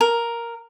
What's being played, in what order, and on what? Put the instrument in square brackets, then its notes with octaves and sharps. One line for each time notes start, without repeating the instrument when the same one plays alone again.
[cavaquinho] A#4